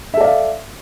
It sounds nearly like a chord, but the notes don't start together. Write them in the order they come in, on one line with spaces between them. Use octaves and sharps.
E5 A4 D5 F5